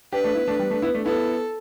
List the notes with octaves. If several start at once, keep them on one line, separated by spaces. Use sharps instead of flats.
D4 G4 B4
A3 D4
B3 E4
A3 D4
G3 B3
A3 D4
B3 E4
A3 D4
B3 E4 A4